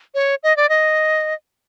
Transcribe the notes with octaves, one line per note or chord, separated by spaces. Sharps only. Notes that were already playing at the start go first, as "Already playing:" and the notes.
C#5
D#5
D5
D#5